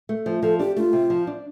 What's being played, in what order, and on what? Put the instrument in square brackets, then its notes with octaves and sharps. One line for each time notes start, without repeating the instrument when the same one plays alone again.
[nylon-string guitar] A3
F3
[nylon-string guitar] F3 [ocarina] A4
[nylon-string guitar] D4 [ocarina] G4
[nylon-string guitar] A3 [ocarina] F4
[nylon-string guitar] C3
F3
D4